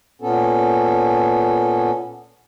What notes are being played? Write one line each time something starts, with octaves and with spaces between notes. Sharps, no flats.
A#2 B3 C#4 A4